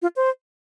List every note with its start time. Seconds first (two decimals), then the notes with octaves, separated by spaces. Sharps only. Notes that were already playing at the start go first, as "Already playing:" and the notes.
0.02 F4
0.16 C5